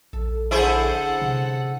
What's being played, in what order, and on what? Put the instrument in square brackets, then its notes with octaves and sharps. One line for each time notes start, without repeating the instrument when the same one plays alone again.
[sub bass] A#1 [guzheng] A4
[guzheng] D3 C#4 D4 [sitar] E4 G#4 C5 [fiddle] A4 F#5
[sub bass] C3